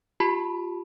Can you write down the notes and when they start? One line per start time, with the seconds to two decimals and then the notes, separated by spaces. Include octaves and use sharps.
0.20 F4 G4 A5 B5